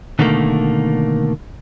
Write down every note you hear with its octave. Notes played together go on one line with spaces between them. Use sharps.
B2 D3 D#3 A3 A#3